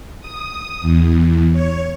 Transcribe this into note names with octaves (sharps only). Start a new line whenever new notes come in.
D#6
E2
C#5